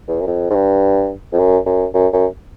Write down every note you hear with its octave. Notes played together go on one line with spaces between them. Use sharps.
E2
F#2
F2
G#2
G2
F2
F#2
F#2
F#2
F#2